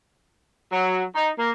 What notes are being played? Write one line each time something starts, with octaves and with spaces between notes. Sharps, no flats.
F#3
D#4
A#3